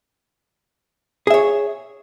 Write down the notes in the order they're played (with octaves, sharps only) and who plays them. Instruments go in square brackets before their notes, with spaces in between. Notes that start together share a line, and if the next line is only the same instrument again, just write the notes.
[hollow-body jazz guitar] G#4
E5
C#5